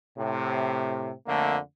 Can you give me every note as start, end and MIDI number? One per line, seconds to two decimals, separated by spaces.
0.18 1.12 45
0.18 1.12 48
1.27 1.58 41
1.27 1.58 50
1.27 1.58 57
1.27 1.58 58